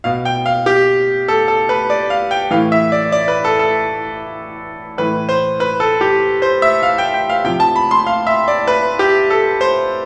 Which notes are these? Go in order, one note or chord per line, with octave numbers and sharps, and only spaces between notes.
B2 F5
G5
F5
G4
A4
A4
B4
D5
F5
G5
A2 E3 F5
E5
D5
D5
B4
A4
A4
A2 E3 B4
C5
B4
A4
G4
C5
E5
F5
G5
G5
F5
C3 F3 G5
A5
B5
C6
F5
E5
D5
B4
G4
A4
C5